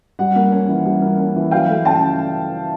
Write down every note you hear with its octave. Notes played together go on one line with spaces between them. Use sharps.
G3 F#5
A#3
C#4
E3
G3
A#3
C#4
E3
F#3 F5 G5
A3
C#3 G5 A5